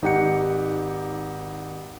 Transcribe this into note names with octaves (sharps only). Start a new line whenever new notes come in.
G#1 D#4 G4 F#5 C#7